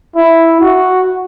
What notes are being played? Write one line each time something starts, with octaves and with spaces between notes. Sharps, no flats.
E4
F#4